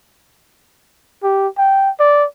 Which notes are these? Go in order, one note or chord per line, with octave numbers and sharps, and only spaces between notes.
G4
G5
D5